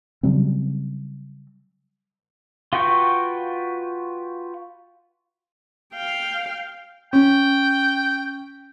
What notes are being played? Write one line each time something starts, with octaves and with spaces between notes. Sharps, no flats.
C#3 F#3 G3 C4
F4 F#4 B4 G5 C#6
F5 G5
C#4 G5